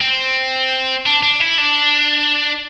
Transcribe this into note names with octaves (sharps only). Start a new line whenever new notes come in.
C4
D4
D4
E4
D4